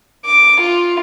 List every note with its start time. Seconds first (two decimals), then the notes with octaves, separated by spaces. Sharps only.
0.25 D6
0.60 F4